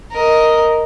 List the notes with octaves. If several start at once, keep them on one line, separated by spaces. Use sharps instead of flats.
A#4 D#5